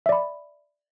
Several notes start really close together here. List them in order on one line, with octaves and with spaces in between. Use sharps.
E5 D5 B5